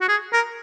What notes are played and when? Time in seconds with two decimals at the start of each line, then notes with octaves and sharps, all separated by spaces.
0.01 F#4
0.08 G#4
0.33 A#4